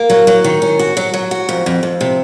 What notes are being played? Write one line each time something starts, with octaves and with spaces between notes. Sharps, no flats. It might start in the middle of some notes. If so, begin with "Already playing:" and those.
Already playing: A#3
F#3
F#3
D#3
C#4
F#4
F#3
F#3
F#4
F2
F2
F2
C3